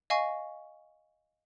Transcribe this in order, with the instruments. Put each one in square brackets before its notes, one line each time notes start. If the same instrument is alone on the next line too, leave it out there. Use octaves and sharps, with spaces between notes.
[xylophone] D#5 F5 G#5 C#6